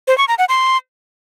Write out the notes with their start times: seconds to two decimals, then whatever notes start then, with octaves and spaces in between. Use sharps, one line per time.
0.07 C5
0.18 C#6
0.28 A#5
0.38 F#5
0.49 C6